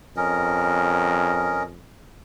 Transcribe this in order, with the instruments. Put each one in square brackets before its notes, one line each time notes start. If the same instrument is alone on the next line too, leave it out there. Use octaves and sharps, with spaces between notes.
[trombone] F2 [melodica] C#4 A#4 D#5